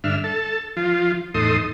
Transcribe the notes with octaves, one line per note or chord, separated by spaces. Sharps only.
G2 D3 D4 E5 F6
A4 A5
F3 F4
E2 A2 D#4 A4 C6 D#6